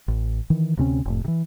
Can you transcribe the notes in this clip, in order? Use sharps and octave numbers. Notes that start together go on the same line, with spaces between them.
A1
D#3 E3
D2 C3 C4 C#4
F1 A2
C3 E3